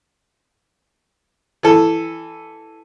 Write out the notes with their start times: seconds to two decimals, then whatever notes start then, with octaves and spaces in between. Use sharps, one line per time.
1.63 E3 A4